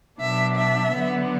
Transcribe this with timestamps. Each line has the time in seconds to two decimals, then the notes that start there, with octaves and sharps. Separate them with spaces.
0.20 B2 F#3 D4 E5
0.56 E5
0.91 D3 F#3 B3